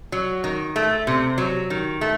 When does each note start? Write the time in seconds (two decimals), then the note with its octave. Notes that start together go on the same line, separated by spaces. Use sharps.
0.12 F#3
0.44 D#3
0.76 A3
1.07 C3
1.38 F#3
1.70 D#3
2.01 A3